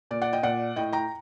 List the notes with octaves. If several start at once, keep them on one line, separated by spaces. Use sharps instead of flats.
A#2 D5
D5 F#5
D#5 G5
A#2 D5 F#5
A2 D#5 G5
G5 A#5